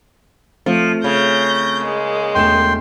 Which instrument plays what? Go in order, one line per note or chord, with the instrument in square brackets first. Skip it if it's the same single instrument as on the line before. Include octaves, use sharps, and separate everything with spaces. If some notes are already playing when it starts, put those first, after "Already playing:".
[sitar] F3 [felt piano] A3 C4 F4
[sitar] C#3 [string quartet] G6 A#6
[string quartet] G#3 A#3
[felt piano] E1 A3 E7 [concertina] G5 C6